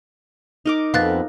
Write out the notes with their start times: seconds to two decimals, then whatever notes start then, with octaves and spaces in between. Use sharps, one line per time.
0.66 D#4 A#4 D6
0.94 F2 B3 F5 F#6 A6